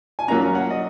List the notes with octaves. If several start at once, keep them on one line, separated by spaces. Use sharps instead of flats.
G#5
F#3 A#3 C#4 A#5
F#5
D#5